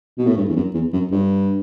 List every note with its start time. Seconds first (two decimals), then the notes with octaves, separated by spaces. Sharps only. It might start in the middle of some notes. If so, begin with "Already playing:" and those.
0.18 B2
0.27 A2
0.37 G2
0.49 E2
0.56 F#2
0.74 E2
0.93 F#2
1.11 G2